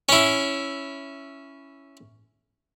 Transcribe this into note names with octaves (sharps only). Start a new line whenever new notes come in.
C#4 E4